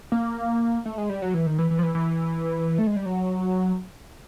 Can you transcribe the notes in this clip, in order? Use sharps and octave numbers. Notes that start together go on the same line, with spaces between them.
A#3
A3
G#3
G3
F#3
E3
D#3
E3
E3
F3
E3
E3
A3
G#3
G3
F#3